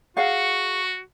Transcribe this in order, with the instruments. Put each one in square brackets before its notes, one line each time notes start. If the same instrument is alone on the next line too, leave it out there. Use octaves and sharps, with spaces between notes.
[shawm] F#4 [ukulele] G#4 F5 F#5 [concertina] C#6